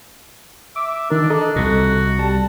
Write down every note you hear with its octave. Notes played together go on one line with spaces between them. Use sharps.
E5 D6
D#3 D4 A#4
A4 D#5 A#5 D#6
C2 C3 F#4
G3 A5